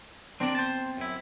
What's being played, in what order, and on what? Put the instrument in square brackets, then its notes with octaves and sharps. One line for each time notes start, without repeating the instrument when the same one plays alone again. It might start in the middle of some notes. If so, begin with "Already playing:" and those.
[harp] C4 [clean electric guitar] D4 A#4 D5
[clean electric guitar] C5 A5
F#2 E4